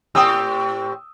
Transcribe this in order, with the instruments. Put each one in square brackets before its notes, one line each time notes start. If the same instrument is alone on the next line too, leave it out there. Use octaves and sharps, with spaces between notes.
[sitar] A2 C4 G4 [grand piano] G5 D#6 E6